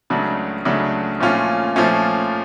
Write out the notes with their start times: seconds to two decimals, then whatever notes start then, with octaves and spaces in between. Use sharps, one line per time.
0.10 C#2 C#3 F#3 A3 D4
0.65 C#2 C#3 F#3 A3 D4
1.20 A#2 F3 A3 C#4 F4
1.76 A#2 F3 A3 C#4 F4